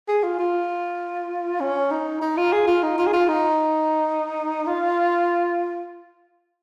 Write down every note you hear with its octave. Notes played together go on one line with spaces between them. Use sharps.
G#4
F4
F4
C#4
D#4
D#4
F4
G#4
F4
D#4
F4
G#4
F4
D#4
F4